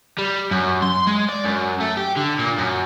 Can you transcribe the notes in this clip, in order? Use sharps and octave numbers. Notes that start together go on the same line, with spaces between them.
G3
F#2
C6
G#3
D5
F#2
A3
G4
D3
A#2
F#2